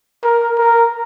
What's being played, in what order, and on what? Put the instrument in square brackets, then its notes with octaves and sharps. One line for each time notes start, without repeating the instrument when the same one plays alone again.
[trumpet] A#4
A#4